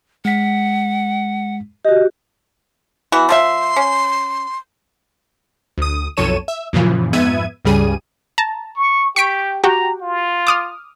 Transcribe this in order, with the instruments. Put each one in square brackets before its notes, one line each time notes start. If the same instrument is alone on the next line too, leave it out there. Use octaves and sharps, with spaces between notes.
[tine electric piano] G#3 B6 [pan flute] F#5
[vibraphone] F#4 G4 [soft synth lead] D#5
[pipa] E3 B3 F#4
[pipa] F3 A4 E5 [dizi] C6
[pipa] C#4
[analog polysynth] D2 D#6
B1 F2 A4 C#5 D#7 E7
E5
F#2 A#2 C#3 E3 F3
F2 G#2 B3 E5 G#6 D#7
C#2 G2 C#3 G3 G#4 D#7
[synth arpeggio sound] A5 A#5
[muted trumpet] C#6
[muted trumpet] G4 [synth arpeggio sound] C#6 B6 D7
[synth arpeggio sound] F#4 G4 G5 [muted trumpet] A#5
[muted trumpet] F4
[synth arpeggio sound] D6 D#6 F6